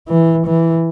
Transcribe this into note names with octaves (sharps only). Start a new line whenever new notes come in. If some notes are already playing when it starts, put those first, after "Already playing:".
E3
E3